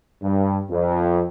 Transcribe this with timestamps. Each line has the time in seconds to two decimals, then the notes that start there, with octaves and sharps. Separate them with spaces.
0.23 G2
0.71 F2